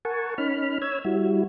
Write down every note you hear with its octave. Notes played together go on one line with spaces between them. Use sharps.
A#4 F#5 G#5 A5 C#6
C#4 D#4 B5 F6
C#5 E6 G#6
G3 E4 F#4